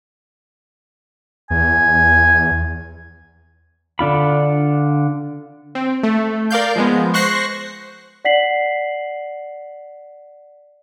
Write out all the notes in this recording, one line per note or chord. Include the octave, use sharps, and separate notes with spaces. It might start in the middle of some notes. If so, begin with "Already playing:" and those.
E2 G#5
D3 D4 F4 B5
C4
A3
A#4 D5 F5 G6
F3 G#3 B3
C5 C#6 F#6 A#6 C7
D5 F#5 B6 C7 F#7